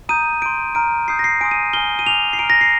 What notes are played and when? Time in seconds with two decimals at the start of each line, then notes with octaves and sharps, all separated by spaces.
0.09 A#5 D#6 G6 D#7
0.42 C6 G6 D7
0.75 A#5 F6 D7
1.07 A#5 D#6 G6 C7
1.19 A#6
1.24 C7
1.41 G#5 C6 D#6 D7
1.51 D#7
1.73 G#5 C6 F6 G7
1.99 D#7
2.06 G#5 D6 F6 F7
2.33 C7
2.39 A#5 F6 D7
2.50 A#6
2.61 C7